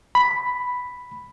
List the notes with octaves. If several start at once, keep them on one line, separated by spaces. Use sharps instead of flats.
B5